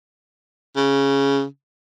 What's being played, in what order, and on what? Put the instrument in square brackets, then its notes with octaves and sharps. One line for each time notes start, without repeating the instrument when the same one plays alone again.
[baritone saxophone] C#3